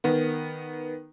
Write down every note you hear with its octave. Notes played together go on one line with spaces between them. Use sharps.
D#3 B3